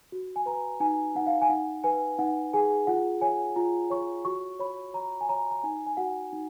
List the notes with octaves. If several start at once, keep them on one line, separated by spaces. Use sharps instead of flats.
F#4
G#5
B4 A#5
D#4 G#5
D#4 F#5
F5
G#5
D#4 F#5
B4 G#5
D#4 F#5
G#4 G#5
F4 F#5
C#5 G#5
F4 A#5
C#5 C#6
F#4 C#6
C#5 B5
C#5 A#5
G#5
C#5 A#5
A#5
D#4 G#5
G#5
F#4 F#5
D#4